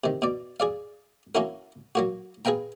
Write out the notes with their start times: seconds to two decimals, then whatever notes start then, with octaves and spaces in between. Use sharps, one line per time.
0.04 C3 D#3
0.22 B2 D5
0.60 G#4 D5 F5
1.35 A#3 C#4 E4 F#4 A#4
1.95 F#3 A#3 F#4
2.45 G#4 B4 F5 G5 A#5